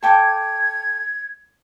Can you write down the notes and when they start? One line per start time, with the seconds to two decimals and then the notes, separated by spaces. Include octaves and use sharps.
0.03 A4 G5 D6 G#6